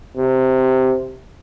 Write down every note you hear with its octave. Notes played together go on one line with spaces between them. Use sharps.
C3